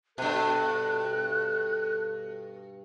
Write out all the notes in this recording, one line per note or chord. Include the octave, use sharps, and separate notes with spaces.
G2 B2 A4 F#6